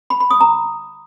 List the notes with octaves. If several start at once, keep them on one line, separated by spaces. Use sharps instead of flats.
B5
B5
D#6
A#5